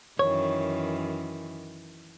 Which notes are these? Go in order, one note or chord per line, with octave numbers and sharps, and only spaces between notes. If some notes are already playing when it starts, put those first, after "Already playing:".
F#2 D#3 E3 C#5